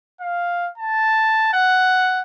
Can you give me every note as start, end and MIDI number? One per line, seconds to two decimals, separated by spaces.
0.21 0.69 77
0.78 1.52 81
1.54 2.22 78